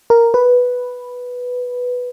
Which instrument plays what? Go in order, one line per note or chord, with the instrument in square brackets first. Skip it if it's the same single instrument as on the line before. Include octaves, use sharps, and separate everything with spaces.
[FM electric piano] A#4
B4